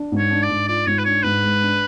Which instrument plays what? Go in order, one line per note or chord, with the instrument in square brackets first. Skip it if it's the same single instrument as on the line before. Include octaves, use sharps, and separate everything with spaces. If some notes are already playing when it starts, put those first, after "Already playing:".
Already playing: [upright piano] D4
G#2
[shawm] C#5
[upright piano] D4
[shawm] D5
[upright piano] G#2
[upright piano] F4 [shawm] D5
[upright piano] G#2 [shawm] C#5
[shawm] B4
[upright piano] D4 [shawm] C#5
[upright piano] G#2 [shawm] B4
[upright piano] G#3
D4